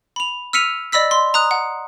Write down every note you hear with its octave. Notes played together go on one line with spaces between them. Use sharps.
B5 F7
E6 F6 B6 C#7 D#7 F7
D5 D#5 B5 E6 B6
C6
A#5 D#6 F#6
F#5